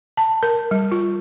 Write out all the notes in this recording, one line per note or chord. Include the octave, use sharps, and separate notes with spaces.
A5
A#4
G3
F4